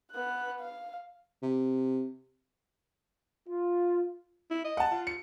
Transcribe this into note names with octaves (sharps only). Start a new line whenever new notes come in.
B3 F#6
F5
C3
F4
E4
D#5
F#5 A5
F4
C#7